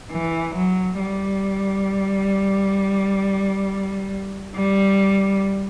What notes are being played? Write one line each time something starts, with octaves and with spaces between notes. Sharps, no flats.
E3
F#3
G3
G3